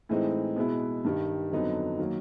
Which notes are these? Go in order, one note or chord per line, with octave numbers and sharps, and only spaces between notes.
A2 E3 G#3 C4 D#4
B2 G#3 B3 E4
G2 D#3 G3
F2 D3 F#3 B3 D#4
D#3 F#3 A#3